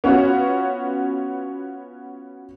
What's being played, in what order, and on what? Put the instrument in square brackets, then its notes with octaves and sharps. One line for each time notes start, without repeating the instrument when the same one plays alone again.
[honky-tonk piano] B3 C#4 F4 F#4 C#5